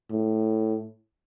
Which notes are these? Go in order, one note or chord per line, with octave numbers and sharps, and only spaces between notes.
A2